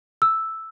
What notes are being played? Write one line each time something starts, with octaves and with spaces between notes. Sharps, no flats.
E6